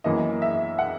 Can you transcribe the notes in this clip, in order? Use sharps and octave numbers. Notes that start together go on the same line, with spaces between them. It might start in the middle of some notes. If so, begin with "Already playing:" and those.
F#2 E3 A#3 D#5
E5
F#5